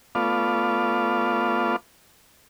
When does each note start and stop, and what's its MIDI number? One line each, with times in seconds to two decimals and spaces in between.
0.15 1.76 57
0.15 1.76 59
0.15 1.76 65
0.15 1.76 74
0.15 1.76 77